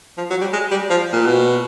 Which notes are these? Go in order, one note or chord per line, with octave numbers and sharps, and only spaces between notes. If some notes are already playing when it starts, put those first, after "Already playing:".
F3
F#3
G3
G#3
G3
F3
A#2
B2